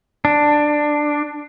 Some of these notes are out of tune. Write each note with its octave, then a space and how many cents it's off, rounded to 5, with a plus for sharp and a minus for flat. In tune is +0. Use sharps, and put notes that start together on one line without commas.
D4 +10